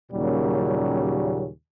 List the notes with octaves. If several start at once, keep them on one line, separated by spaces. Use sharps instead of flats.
D#2 A#2 C#3 F#3 G3 C#4